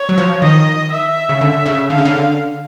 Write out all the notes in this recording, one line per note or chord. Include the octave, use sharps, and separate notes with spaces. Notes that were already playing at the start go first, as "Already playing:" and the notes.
Already playing: C#5
F#3
F3
D#3 D#5
E5
C#3
D3
C#3
D3 F5
C#3
D3